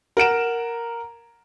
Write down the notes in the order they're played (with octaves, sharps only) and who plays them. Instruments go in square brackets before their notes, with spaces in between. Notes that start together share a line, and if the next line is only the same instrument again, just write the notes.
[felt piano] A#4 F#5 D7 E7